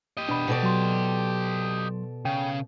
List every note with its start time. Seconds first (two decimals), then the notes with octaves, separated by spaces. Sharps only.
0.17 G4 D#5
0.29 B2 D4 B5
0.48 B2 A4 D5
0.63 F#3 C6
2.25 C#3 G5